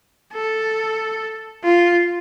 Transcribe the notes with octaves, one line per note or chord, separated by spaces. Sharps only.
A4
F4